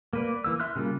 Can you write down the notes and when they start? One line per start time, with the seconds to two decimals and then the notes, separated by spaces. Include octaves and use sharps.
0.13 A#3 B4 D5
0.44 E3 A#3 E6
0.60 E5 C6 F6 F#6
0.76 C#3 G3 A#3 F4